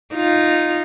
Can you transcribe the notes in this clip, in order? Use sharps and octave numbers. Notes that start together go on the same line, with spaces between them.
D#4 F4